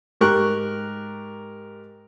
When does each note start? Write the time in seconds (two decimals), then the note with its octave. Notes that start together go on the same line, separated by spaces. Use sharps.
0.21 G#2 G4 A#4 C#6 F#6